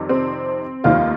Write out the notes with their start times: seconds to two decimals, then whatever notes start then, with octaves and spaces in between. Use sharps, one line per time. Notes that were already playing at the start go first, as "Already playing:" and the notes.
Already playing: F2 C3 D#3 G3
0.09 C4
0.84 F1 D#2 D#3 G3 F4